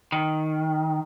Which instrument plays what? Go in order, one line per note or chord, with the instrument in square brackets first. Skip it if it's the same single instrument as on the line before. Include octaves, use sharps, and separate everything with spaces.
[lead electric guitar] D#3